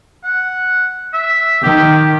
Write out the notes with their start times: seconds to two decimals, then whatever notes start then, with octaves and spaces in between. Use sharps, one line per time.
0.24 F#5
1.13 E5
1.63 D#3 G4